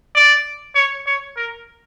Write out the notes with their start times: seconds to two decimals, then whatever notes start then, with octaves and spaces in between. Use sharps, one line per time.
0.15 D5
0.75 C#5
1.07 C#5
1.37 A#4